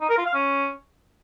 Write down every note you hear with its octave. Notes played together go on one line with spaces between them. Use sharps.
D#4
A#4
F4
F5
C#4